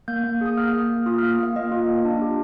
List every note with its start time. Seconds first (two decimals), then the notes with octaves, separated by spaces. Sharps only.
0.08 A#3 G6
0.24 A#3
0.41 G#4 D#6
0.57 A#3 F6
0.73 A#3
0.90 A#3
1.06 F4 D#6
1.18 F6
1.23 A#3
1.39 A#3 F5
1.56 A#3 D#5
1.72 F4
1.89 A#3
2.05 D4
2.22 G4